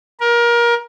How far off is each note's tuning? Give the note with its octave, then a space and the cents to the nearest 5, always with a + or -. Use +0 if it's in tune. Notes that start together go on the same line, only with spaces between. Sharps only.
A#4 +25